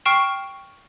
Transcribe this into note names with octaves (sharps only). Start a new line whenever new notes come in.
G5 C#6 F6 C7 D7 E7